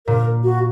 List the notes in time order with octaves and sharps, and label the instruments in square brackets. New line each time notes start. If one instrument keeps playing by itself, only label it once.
[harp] A#2 [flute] A#4
[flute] F#4